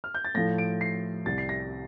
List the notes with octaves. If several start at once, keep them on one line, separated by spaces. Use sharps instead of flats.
F6
G6
A6
A2 F3 A3 A#6
D7
C7
C2 C3 G3 A6
C7
A#6